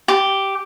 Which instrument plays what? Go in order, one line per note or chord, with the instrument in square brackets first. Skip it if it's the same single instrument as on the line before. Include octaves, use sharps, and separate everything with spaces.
[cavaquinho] G4